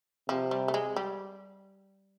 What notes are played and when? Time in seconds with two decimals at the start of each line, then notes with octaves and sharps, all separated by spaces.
0.29 C3 F3
0.51 G3
0.68 A3
0.74 G#3
0.96 G3